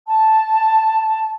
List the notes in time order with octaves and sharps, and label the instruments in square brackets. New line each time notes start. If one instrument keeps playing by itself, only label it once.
[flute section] A5